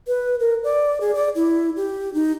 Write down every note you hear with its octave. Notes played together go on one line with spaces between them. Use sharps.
B4
A#4
D5
G#4
D5
E4
G4
D#4